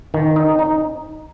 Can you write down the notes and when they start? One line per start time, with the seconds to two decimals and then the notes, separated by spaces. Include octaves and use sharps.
0.14 D#3
0.36 D#4
0.59 D#4